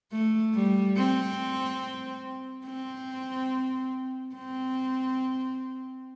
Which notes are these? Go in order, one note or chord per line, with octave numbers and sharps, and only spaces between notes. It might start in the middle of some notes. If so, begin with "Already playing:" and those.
A3
G3
C4
C4
C4